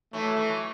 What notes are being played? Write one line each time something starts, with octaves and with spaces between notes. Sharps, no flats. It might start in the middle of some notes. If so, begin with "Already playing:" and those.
E3 F#3 A3
E3 F#3